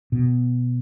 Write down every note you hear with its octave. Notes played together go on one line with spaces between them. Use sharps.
B2